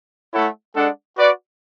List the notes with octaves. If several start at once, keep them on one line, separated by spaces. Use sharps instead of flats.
A3 E4 A4 C#5 F#5
G#3 D4 A4 D5 F#5
F#4 B4 D5 F#5